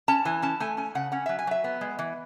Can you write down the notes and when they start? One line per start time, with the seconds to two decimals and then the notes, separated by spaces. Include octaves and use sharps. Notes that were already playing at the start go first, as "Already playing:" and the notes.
0.08 C#4 A5
0.25 E3 G#5
0.42 C#4 A5
0.60 A3 G#5
0.77 C#4 G#5
0.95 C#3 F#5
1.12 C#4 F#5
1.26 F#3 E5
1.39 G#5
1.47 F#3 E5
1.64 B3
1.81 G#3
1.99 E3